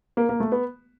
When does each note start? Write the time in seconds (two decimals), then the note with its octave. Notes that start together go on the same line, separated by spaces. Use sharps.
0.17 A#3
0.29 A#3
0.40 A3
0.52 B3